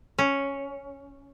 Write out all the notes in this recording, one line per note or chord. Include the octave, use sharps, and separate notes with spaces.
C#4